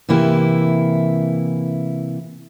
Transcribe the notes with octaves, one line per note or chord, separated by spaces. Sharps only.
C3 E3 A#3 E4